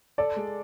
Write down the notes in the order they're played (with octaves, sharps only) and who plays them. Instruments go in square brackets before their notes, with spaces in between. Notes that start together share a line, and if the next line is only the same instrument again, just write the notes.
[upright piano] A4 [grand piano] D5
[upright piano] G#3